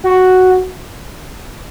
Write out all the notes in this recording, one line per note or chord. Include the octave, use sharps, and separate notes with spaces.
F#4